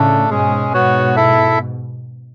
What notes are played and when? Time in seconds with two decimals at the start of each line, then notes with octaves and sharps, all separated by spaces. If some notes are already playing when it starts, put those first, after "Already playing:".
Already playing: A2 C#3 A3 D4 A4
0.30 G#2 B2 G#3 C#4 G#4
0.73 G#2 B2 B3 F#4 C#5
1.16 E4 A4 E5